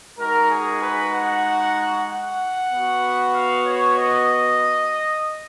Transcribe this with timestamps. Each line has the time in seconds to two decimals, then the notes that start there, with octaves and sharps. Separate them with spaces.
0.18 G#3 D#4 F#4 A#4
0.51 G#4
0.82 B4
1.13 F#5
2.09 F#5
2.72 B3 F#4
3.34 F5
3.66 C#5
3.98 D#5